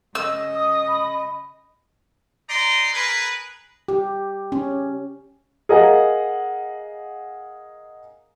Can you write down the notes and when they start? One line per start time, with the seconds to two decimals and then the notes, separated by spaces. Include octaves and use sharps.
0.15 C#3 D#5 E6
0.55 D#6
0.89 B5
2.49 D#4 D5 A#5 C6
2.93 G#4 A#4 B4
3.88 G4
4.52 C#4
5.69 G#4 A#4 D#5 F5 F#5 G#5